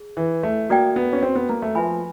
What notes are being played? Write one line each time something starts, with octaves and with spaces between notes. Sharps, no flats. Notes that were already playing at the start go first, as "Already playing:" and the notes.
Already playing: G#4
E3
A3
A#3 F#4 A4 D5 G5
B3
C#4
C4
B3
A#3
A3
F3 B4 E5 G#5 B5